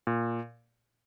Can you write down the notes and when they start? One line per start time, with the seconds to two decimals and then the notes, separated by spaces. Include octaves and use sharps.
0.07 A#2